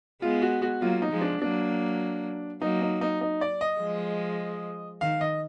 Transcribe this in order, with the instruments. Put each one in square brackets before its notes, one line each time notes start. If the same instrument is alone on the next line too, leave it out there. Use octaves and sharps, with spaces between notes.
[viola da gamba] G#3 B3 [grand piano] F4
[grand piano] F#4
F#4
[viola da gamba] F#3 A#3 [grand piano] F4
[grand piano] D#4
[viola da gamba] F3 G#3
[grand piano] D4
[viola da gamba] F#3 A#3 [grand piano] D4
[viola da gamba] F#3 A#3 [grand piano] D#4
[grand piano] D#4
D#4
D#4
D5
D#5
[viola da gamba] F3 G#3
[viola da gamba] D#3 [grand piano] F5
[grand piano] D#5